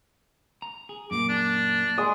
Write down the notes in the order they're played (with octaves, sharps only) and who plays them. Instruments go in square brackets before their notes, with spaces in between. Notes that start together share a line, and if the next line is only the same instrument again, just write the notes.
[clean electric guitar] A#5
G#4
[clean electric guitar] F#2 A#2 A#3 [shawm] D6
[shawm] D4
[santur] G#3 D#6